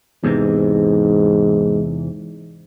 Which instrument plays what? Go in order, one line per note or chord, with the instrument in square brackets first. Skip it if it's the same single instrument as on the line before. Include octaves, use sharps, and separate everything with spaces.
[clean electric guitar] E2 C3 E3 [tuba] G#2